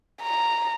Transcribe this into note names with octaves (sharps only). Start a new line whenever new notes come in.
A#5